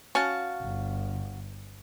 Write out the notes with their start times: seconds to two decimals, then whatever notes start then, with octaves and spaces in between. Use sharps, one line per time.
0.15 C#4 F#4 F5 A5
0.62 G1